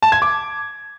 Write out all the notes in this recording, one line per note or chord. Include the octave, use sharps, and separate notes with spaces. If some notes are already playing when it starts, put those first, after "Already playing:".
A5
G#6
D6